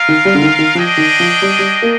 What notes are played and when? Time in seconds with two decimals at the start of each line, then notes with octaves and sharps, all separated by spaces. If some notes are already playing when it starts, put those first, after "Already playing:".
Already playing: F4 A#4 F5
0.08 D#3
0.25 G3
0.35 D3
0.42 D#3
0.59 D#3
0.75 F3 D4 G#4 D#5 G5
0.97 D#3
1.20 F3
1.42 G3
1.59 G3
1.82 A#3